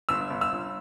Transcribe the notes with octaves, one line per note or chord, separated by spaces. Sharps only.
G1 E6
G1
E6
G1